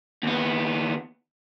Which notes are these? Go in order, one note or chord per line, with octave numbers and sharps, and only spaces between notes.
D#2 B3